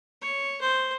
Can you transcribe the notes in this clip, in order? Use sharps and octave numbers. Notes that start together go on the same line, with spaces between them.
C#5
C5